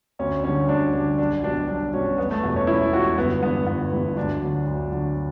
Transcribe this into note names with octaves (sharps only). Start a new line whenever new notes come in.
D2 C#4
D3 G3 C#4
D2 D4
D3 G3 D4
B1 D4
B2 G3 D4
B1 D4
B2 G3 C#4
E1 B3
A3
E2 B2 G3 B3
C#4
E1 E4
E2 B2 G3 F#4
G1 B3
G2 E3 G3 B3
G1 B3
G2 E3 G3
D2 D4
D3 F#3
D2
D3 F#3